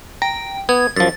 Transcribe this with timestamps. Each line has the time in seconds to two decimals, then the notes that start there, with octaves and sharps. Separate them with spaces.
0.22 G5 A#5
0.69 B3 G#6
0.96 F#2 F3 A6